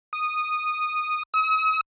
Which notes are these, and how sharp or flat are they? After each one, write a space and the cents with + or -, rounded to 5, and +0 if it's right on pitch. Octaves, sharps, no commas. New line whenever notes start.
D#6 -10
D#6 +45